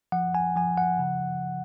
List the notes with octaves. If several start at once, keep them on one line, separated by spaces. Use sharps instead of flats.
F3 F#5
G#5
F3 G#5
F#5
C#3